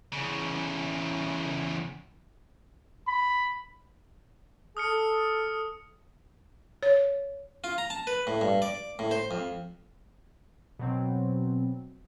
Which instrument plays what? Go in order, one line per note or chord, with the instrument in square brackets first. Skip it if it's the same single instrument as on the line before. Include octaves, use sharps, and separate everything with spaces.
[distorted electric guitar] E2 C#3
[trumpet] B5
[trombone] A4 [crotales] D#6 F6 C#7
[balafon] C#5
[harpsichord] F4
A#5
A5
B4
A2
G2
D5
A2
C5
F2
[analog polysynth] B2 F#3 C4